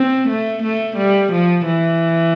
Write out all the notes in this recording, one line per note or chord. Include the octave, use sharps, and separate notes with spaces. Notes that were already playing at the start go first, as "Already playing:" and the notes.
Already playing: C4
A3
A3
G3
F3
E3